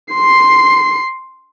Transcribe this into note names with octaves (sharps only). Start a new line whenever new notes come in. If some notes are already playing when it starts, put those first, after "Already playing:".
C6 C7